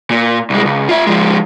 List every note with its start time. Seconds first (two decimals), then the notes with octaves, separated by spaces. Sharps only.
0.11 A#2
0.50 C2 G#3
0.65 C#2
0.89 F4 E5
1.07 F3 G#3